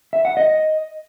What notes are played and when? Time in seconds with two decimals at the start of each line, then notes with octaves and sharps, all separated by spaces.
0.13 E5
0.25 F#5
0.37 D#5